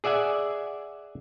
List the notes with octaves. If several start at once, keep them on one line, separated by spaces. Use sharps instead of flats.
G#4 D5 E5 F#5 G#5